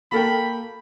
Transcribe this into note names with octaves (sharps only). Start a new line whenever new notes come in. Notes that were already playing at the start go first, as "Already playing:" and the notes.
A#3 F#4 A4 A#4 G5 B5